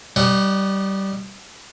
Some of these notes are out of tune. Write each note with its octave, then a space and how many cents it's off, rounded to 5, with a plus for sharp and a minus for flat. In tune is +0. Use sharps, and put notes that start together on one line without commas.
G3 -15 D#4 -30 F#5 +25